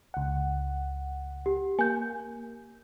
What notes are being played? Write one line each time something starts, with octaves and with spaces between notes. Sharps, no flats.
C#2 F#5
G4
A#3 G#5 G6